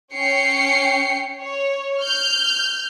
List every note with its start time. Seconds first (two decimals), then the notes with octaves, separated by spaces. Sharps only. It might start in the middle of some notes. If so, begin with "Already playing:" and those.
0.13 C#4 G5 C7 C#7
1.41 C#5
2.00 F6 G6